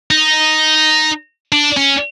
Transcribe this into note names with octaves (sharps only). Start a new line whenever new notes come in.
D#4
D4
C#4